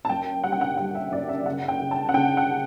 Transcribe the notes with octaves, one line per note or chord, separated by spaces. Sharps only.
A5
F#2 G5
G3 F#5
G5
F#5
G3 F#5
E5
F#2 D5
E5
C#3 F#5
G5
C#3
A5
F#5
C#3 G5
F#5